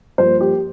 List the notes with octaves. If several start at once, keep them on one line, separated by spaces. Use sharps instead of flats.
G2 F3 A#3 C5
G4